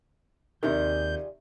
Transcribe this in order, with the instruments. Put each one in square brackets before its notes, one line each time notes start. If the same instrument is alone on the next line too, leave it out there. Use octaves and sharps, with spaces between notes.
[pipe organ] D#2 G6 [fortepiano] C3 D#3 [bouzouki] G3 F4 G#4